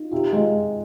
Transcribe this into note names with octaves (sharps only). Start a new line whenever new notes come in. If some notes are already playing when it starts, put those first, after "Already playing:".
Already playing: D#4 F4
C3 F4
G#3 F4